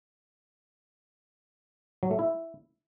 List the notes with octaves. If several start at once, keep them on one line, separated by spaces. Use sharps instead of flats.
F#3
A3
E4